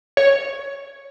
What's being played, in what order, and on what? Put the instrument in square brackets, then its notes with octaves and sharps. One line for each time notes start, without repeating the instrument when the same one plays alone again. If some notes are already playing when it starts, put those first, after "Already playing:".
[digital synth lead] C#5